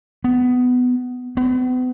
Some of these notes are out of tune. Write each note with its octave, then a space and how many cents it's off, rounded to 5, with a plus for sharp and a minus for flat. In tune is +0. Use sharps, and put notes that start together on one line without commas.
B3 +15
B3 +40